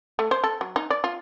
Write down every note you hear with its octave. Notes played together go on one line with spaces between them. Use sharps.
A3
C5
A4
F#3
D#4
D5
F4